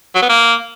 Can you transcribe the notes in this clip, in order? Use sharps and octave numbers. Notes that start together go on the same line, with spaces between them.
F#3
B3
A#3